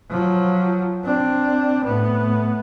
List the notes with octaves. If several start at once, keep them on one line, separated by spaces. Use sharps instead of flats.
F3 F#3
C4 D4
A2 B3